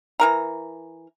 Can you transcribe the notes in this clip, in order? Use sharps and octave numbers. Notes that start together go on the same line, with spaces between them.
E3 A#4 A#5